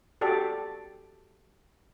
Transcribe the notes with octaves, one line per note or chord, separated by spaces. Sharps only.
F#4 G4 A4 D5